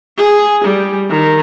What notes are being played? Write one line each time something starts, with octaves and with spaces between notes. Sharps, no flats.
G#4
G3
D#3